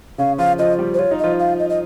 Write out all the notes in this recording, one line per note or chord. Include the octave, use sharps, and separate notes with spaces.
C#3 C#4 F5
F3 F4 F5
F3 F4 D#5
G3 G4
C5
F4 C#5
D#4
F3 F4 D#5
F5
D#5
D#5